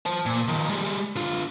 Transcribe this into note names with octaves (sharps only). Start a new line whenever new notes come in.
C5 A5
A#2
D#3 F3
G3 G#3
D3 F4